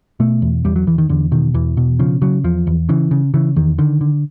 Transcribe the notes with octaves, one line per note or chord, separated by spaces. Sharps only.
B2 A3
E2
E2 G3
F#3
E2 E3
D#3
E2 D3
B2 D#3
E2 E3
B2
C#3 F3
C#3 F#3
E2 F3
E2
C#3 E3
C#3
C#3 E3
E2 D#3
D3 D#3
D3